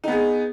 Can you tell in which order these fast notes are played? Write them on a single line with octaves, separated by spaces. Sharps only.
D#4 B3 G#4